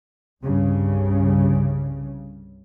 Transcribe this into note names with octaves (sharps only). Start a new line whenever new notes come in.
C2 G2 C#3